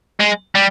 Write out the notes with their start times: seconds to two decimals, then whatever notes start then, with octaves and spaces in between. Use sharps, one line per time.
0.20 G#3
0.55 G3